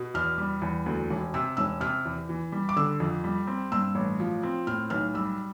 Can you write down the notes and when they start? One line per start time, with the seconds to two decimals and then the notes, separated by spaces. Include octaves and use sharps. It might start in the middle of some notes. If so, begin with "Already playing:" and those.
Already playing: B2
0.14 E2 F6
0.38 G3
0.62 E2
0.86 D2
1.10 E1
1.34 C3 E6
1.57 E1 E6
1.81 C3 F6
2.05 E2
2.29 E3
2.52 G3
2.69 D6
2.76 D3 E6
3.00 F2
3.24 G3
3.47 C4
3.72 G2 E6
3.95 A1
4.20 F3
4.43 C4
4.67 A2 F6
4.90 B1 F6
5.14 G3 E6